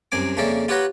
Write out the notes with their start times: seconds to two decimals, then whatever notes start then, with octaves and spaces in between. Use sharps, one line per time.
0.12 C2 F#2 C4 G#5 D6
0.37 F2 C#3 A#3 C#4 D5 E5
0.68 F4 G4 B4 C#5 F#5 A#5